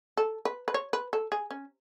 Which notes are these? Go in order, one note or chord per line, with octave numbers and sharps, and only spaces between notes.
A4
B4
B4
C#5
B4
A4
G#4
C#4